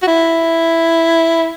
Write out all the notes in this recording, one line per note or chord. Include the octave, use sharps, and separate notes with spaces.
F#4
E4